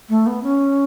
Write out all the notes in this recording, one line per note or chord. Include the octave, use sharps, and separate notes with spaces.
A3
B3
C#4